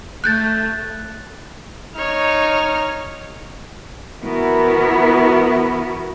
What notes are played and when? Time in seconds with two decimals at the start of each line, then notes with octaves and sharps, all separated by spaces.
0.24 A3 F#6 G6 A6
1.95 D#4 C#5 F6
4.22 E3 B3 E4 F#4 A#4 B4